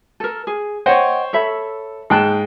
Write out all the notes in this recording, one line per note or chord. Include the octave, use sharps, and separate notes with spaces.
A4 A#4
G#4
C5 C#5 D#5 F#5 G5
A4 C#5 E5 B5
G#2 G#4 A4 G5 A5 F#6